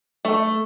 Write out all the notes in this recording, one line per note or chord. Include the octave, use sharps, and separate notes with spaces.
A3